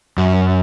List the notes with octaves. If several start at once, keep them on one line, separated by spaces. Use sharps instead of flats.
F#2